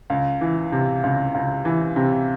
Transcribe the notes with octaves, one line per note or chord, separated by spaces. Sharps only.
C#2
E3
C3
C#2
C#2
E3
C3